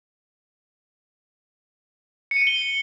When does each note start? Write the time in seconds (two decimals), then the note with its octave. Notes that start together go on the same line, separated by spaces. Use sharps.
2.31 C#7
2.36 D#7
2.42 C#7
2.47 G7